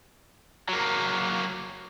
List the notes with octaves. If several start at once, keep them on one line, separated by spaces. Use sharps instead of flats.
F#3 A#3